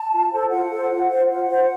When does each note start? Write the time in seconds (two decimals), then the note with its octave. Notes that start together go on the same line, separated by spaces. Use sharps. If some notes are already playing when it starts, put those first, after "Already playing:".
Already playing: A5
0.11 F4
0.32 A4 C5
0.50 F4 F#5
0.70 A4 C5
0.90 F4
1.10 C5
1.29 F4 F#5
1.49 C5